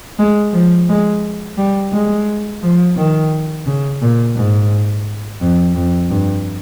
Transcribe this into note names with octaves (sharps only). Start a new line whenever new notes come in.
G#3
F3
G#3
G3
G#3
F3
D#3
C#3
A#2
G#2
F2
F2
G2